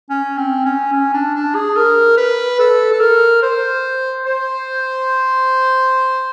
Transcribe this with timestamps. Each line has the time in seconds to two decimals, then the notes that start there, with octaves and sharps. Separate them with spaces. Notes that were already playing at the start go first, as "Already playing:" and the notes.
0.09 C#4
0.37 C4
0.65 C#4
0.92 C#4
1.14 D4
1.35 D4
1.55 G#4
1.76 A#4
2.18 B4
2.59 A4
2.92 A4
3.00 A#4
3.42 C5
4.25 C5